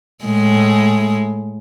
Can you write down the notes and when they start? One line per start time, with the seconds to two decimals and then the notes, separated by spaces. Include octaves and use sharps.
0.25 A2 G#3